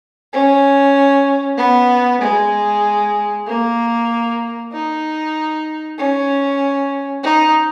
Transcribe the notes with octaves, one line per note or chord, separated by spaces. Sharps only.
C#4
B3
G#3
A#3
D#4
C#4
D#4